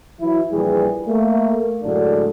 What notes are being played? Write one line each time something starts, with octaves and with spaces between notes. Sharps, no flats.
E3 F#3 E4
A#1 E3 G3 G#4
A3 A#3
F#2 A2 D3 G#3 D4